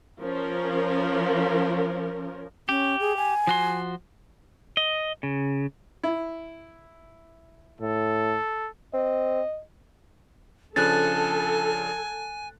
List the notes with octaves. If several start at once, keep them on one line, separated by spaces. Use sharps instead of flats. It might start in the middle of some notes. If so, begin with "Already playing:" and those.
F3 C#4 A#4
C#4 G4
G#4
G#5
F3 F#4 C6
D#5
C#3
E4
A2 A4
C4 D#5
C#3 F3 D4 A4 G#5 F#6 A6